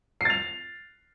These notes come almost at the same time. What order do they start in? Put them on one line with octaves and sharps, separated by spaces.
C7 A6 F7